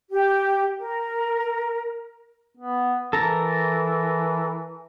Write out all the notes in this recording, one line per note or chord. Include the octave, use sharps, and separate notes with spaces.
G4
A#4
B3
E3 A4 A#4 A#5